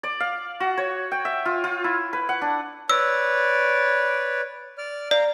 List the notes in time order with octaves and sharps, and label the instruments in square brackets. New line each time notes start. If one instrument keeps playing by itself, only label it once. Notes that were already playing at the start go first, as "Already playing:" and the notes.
[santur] D5
F5
F#4
C#5
G5
E5
F4
F4
E4
B4
F#5
D4
[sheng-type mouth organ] B4 C#5 D5 [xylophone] E6
[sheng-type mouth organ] D5 F6
[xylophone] D5 [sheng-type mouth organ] F5 A#5